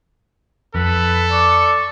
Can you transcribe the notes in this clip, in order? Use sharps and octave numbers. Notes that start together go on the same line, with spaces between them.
F2 A4 B4
D5 C#6